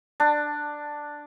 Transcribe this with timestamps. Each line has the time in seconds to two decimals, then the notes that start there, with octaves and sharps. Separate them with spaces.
0.20 D4